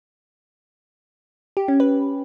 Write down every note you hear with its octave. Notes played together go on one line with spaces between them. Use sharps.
G4
C#4
B4